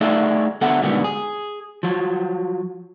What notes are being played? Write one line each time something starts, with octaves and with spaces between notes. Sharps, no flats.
A3 D#4 G#4 D5 E5
D3 B3 A4 E5 F#5
G#2 B2 D3 D#3 G3 B3
G#4
F3 F#3